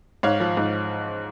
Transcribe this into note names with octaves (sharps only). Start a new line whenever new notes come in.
G#2 C#5 F5
F3
G#2